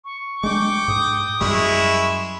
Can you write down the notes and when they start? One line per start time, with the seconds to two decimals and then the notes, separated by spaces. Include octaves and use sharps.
0.05 C#6
0.44 G#3 D4 G5 D6
0.88 G#2 D#6
1.41 F#2 G3 G#3 E4 C#6
1.76 E7